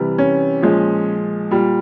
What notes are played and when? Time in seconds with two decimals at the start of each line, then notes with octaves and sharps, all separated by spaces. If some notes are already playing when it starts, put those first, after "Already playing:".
Already playing: C3 E3 G3
0.18 C#4
0.62 A#2 F3 G#3
1.51 A#2 G3